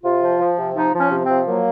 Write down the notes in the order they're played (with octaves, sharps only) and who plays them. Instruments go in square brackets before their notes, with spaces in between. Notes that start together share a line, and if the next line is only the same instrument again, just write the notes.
[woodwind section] C3 F4
F3
F3
C3
F3 D#4
F3
C#4
C3
C4
F3
F#3 A#3